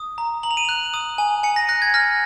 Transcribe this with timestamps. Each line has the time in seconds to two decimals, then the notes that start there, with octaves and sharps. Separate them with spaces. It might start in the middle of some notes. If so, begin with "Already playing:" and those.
Already playing: D#6
0.18 A#5
0.43 A#5 F#7
0.51 F7
0.57 D#7
0.65 F7
0.69 F#6
0.94 D#6 D#7
1.18 G#5
1.43 G#5 C#7
1.56 A#6
1.69 F#6 A#6
1.82 G#6
1.94 F6 A#6